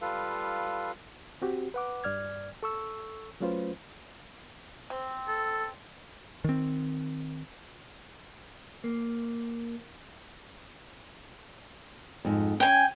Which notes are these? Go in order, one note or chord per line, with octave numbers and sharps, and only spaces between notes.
G3 F4 A4 B4 F5
C4 F#4 G4
B4 F#5 D6
G2 D5 F6 G#6
A4 C#6 E6
F#3 A3 C#4 F4 B4 C5
C4
A4
D#3 C4
A#3
F2 G#2
C#4 G5 G#5